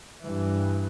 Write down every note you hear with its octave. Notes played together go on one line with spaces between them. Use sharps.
G2 E3